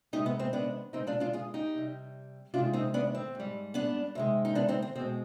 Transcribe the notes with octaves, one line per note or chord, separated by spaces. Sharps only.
C3 D#3 G#3 D#4 G4
B3
C4
B3 D4
B2 G#3 C4 D#4
D4 F4
D4 F4
F4 G#4
D#4 G4
C3 G3
C3 D#3 G#3 D4 F4
C4 D#4
B3 D4
C4
G#2 G3
B3 D4
C3 D#3 G#3
D#4
B3 D4
C4 D#4
C4
B2 G#3 C4